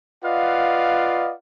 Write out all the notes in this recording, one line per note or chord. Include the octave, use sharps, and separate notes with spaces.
F4 B4 D5 D#5 F5 F#5